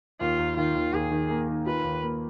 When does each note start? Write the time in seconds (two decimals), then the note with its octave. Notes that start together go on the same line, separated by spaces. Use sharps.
0.20 D#2 F4
0.39 D#2
0.57 D#3 F4
0.75 D#2
0.93 D#2 G#4
1.11 D#3
1.30 A#3
1.48 D#3
1.66 F4 B4
1.84 D#2
2.03 A#3